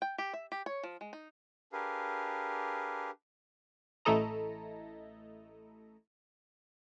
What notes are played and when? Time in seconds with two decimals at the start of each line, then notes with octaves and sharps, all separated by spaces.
0.02 G5
0.18 G4
0.33 E5
0.52 G4
0.66 C#5
0.83 F3
1.01 G#3
1.13 D#4
1.73 D4 G4 G#4 A#4 B4 F5
4.05 A1 A3 E4 A4 D#5 A#5